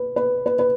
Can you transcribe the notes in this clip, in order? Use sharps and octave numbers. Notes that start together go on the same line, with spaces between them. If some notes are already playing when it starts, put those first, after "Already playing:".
Already playing: B4
B4
B4
B4